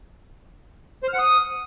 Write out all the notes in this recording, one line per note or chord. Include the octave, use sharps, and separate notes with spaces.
C5
F6
F#5
D#6